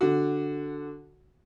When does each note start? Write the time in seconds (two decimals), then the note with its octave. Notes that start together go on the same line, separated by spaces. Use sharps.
0.01 D3 F#4